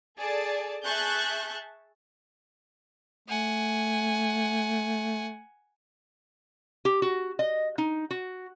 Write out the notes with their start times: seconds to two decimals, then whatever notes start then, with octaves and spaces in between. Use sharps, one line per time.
0.18 G#4 A4 D5 A5
0.85 G#4 E5 A5 C#6 F#6 G6
3.28 A3 F#5 G#5
6.85 G4
7.02 F#4
7.39 D#5
7.78 D#4
8.11 F#4